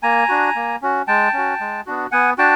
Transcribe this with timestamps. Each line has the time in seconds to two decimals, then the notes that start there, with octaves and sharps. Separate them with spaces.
0.03 A#3 G#5 A#5
0.29 D4 F#4
0.55 A#3
0.82 C#4 F#4
1.07 G#3 G5 A5
1.33 C#4 F#4
1.60 G#3
1.86 B3 D4 F#4
2.12 B3 F#5 G#5
2.38 D4 F#4 G5 A5